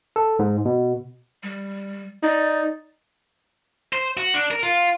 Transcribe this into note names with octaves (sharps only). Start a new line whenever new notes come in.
A4
G#2
B2
G3
D#4 D5
C5
F#4
D4
A#4
F4